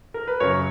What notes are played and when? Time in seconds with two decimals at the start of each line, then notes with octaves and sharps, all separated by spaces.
0.14 A#4
0.27 B4
0.40 F#2 C#3 F#3 A#4 C#5